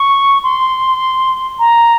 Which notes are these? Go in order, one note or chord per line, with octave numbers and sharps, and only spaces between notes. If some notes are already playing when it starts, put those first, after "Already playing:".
Already playing: C#6
C6
A#5